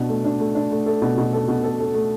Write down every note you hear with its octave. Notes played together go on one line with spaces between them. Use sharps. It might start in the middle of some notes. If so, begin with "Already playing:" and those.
Already playing: B2 D4
A3
D4
A3
D4
A3
A4
B2
B2
A4
B2
A4
A4
A3